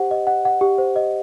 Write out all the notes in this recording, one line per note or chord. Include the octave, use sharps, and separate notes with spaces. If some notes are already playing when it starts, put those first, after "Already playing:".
Already playing: G4 C5 F#5
D#5
F#5
F#5
G4
C5
D#5